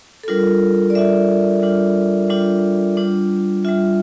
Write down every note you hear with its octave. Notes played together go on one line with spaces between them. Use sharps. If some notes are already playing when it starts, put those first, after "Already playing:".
A4
G3 D4 F4 A#4
D5
G3 D4 F4 E5
G3 D4 F4
G3 D4 F4
G3 D4 F4
G3 D4 F4 E5